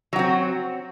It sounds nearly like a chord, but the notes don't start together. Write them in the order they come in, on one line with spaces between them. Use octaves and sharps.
F#3 F#4 C4